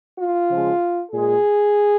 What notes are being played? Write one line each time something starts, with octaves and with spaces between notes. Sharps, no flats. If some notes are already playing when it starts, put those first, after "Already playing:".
F4
C#3 F3 G#3
A#2 G#3 G#4